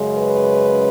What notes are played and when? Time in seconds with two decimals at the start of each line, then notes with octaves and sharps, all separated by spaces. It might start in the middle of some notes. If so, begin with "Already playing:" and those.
Already playing: F#2 C#3 G#3 C#4
0.18 B4